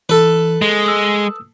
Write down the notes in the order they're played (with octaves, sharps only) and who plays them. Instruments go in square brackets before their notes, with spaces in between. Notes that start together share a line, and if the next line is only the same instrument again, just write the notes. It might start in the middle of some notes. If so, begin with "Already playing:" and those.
[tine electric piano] E3 [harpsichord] A4 B4
[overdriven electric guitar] G#3
[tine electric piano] D#6 E6